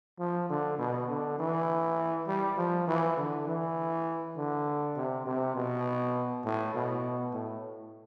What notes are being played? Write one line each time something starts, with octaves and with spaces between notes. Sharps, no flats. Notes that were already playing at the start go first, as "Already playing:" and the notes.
F3
D3
B2
D3
E3
G3
F3
E3
D3
E3
D3
C3
C3
B2
A2
B2
A2